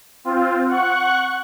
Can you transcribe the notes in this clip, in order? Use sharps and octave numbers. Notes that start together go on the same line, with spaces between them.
C4 F4
F#5 C#6 F#6